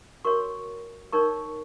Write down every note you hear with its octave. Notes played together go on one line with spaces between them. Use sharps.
F#4 A#4 C#5 C#6
D#4 A#4 C#5 C#6